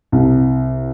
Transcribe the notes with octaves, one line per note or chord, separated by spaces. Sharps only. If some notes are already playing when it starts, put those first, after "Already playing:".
C2